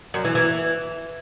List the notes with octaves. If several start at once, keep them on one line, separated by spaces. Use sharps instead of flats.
F#2
E3
E3